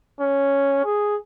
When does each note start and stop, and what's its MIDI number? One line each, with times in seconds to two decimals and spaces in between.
0.20 0.83 61
0.85 1.16 68